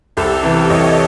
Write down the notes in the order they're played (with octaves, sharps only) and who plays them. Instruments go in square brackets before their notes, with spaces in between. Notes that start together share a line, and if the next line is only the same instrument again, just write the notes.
[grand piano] C2 [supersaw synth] G4 A4
[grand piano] C3 E3
[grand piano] C2 [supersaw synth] C#5 D#5